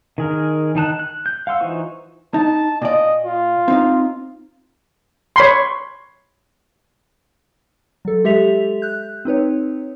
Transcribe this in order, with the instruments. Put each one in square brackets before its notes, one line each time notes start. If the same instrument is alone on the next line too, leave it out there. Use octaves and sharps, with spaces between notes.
[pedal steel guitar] D#3 G#4 A#4
D#3 D#4 A5 F#6
F#6
G6
F5 F#5 C6 E6
E3 D#4 F4 C5 C#6
[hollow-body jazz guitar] D#4 [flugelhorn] A5
[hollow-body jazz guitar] A#2 D5 [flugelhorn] D#5
[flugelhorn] F4
[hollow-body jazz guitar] C4 D#4 F5
[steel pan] C#5 B5 C6
[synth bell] F#3 A4
G#3 G4 A4 E5 B6 F7
F#6 G6
C4 D#4 B4 C#5